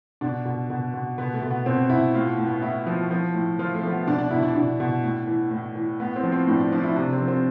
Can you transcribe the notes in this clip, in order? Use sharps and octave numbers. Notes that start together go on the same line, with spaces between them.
B2 D4
B2
B2
B2
B2 B3
A3
B2
B3
B2 C4
B2 E4
A2 F4
A2
B3
A2 E4
F3
F3
A2
F3 F4
A3
F3
B3
B2 D4
D4
B2 E4
D4
B2 D4
B2
A2
E3
A2
E3
A2 B3
C4
F3
C4
A2 D4
D4
F3 D4
E4
C3 D4
C4
F3
C4